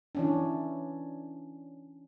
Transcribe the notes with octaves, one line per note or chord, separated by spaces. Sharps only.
E3 C#4 D4